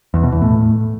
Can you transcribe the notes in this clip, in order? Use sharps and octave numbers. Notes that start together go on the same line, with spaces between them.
E2
B2
E2
A2